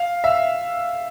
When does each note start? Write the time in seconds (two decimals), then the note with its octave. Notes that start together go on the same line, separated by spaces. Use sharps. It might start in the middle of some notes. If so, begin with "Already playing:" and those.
Already playing: F5
0.24 E5